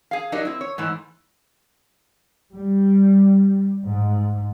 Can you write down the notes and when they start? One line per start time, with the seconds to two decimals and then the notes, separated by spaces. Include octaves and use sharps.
0.11 G#4 F5
0.32 F#3 D#4 G4 A#4 D5 D#5
0.45 C4 E4
0.61 C#5
0.78 G#2 E3 A3
2.54 G3
3.86 G#2